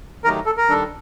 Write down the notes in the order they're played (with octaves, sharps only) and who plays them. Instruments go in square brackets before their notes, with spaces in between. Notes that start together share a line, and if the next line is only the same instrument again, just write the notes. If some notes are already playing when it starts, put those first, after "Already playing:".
[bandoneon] D#3 F#3 A3 D#4 G4 [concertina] A#4
[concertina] A4
A#4
[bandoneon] D#3 G3 D4 A4